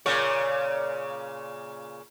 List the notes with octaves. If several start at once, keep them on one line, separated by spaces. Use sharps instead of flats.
A#2 C#3 C#5